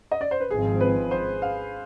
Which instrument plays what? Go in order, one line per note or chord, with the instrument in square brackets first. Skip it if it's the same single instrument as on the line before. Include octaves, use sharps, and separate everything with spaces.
[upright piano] D#5
D5
C5
B4
[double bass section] G#1 G#2 F3 C4 [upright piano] G#4
[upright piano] B4
C5
F5